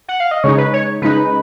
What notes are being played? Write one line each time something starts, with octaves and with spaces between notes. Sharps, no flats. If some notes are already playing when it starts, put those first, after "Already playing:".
F#5
F5
D#5
C#3 G#3 D#4 C#5
B4
C#5
C#3 G#3 D#4 B4